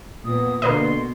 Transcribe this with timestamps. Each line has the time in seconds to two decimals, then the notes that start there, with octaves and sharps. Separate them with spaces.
0.25 A#2 B3 D#6
0.62 B2 D3 A#3 B4 D#5 C6